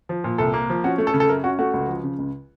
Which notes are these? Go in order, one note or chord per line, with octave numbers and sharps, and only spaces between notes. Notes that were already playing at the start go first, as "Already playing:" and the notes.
F3
A#2
C2 A4
A#3
F3
C#4 F#4
A3
A4
C#3
A4
F#2 A#4
C#4 F#4
A3 F#4
C#2
F3
C#3
C#2